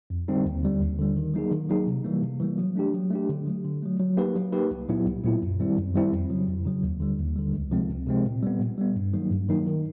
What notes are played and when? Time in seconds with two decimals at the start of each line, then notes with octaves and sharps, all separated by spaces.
0.10 F2
0.28 D3 G3 C4 D#4
0.46 D#2
0.63 D3 G3
0.80 D#2
0.99 D3 G3
1.17 D#3
1.34 F#3 A#3 D#4 G#4
1.51 D#3
1.69 F#3 A#3 D#4 G#4
1.86 C3
2.05 E3 G3 A#3
2.22 C3
2.40 E3 G3 A#3
2.58 F#3
2.75 A3 D4 G4
2.94 F#3
3.10 A3 D4 G4
3.29 D3
3.46 F#3 A3
3.64 D3
3.83 F#3 A3
4.00 F#3
4.17 A#3 D#4 G4 B4
4.35 F#3
4.52 A#3 D#4 G4 B4
4.71 C2
4.88 A#2 F#3 B3 E4
5.06 C2
5.23 A#2 F#3 B3 E4
5.42 F#2
5.60 D#3 G3 C4 E4
5.77 F#2
5.94 D#3 G3 C4 E4
6.12 F2
6.30 C#3 F#3
6.48 F2
6.65 C#3 F#3
6.83 D#2
7.00 D3 G3
7.19 D#2
7.36 D3 G3
7.53 C#2
7.71 C3 F3 G#3 C4
7.90 C#2
8.07 C3 F3 G#3 C4
8.25 A#2
8.43 G3 B3
8.60 A#2
8.78 G3 B3
8.96 G2
9.13 D#3 F#3 A#3 D#4
9.31 G2
9.49 D#3 F#3 A#3 D#4
9.67 D#3